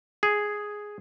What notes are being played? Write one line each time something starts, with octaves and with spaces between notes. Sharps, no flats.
G#4